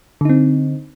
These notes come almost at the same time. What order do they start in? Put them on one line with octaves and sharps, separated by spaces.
D3 D#4 C4